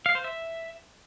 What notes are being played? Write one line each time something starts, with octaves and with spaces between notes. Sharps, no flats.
F5
C5
E5